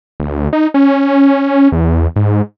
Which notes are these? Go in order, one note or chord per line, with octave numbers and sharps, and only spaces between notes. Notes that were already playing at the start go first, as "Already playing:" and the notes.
D2
D#4
C#4
E2
G#2